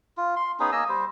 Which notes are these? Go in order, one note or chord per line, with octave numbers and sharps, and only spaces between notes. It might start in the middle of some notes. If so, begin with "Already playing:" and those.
F4
C6
B3 C#4 D#4 G#4
A#3 D#5 G#5 E6
G3 C5